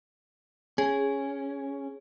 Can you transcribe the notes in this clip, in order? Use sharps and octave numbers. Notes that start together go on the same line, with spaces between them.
C#4 G#4